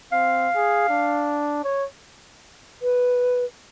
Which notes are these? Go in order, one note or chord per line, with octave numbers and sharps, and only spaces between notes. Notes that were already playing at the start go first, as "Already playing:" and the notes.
C4 F5
G#4
D4
C#5
B4